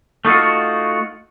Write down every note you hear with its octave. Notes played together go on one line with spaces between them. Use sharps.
A3 D#4 F4 F#4